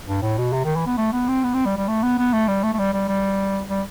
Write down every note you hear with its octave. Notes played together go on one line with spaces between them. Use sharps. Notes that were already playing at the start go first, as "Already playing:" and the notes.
G2
A2
B2
C3
D#3
E3
B3
A3
B3
C4
B3
C4
G3
G3
A3
B3
B3
A3
G3
A3
A3
G3
G3
G3
G3